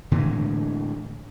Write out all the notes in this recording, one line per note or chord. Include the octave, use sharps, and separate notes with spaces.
A2 D3 E3 G#3